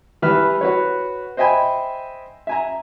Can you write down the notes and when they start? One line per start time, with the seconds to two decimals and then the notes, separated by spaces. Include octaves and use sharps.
0.22 E3 G3 B4 E5 F6
0.61 F#4 B4 C#5
1.37 C5 D#5 E5 G5 G#5 B5
2.47 E5 G#5 A#5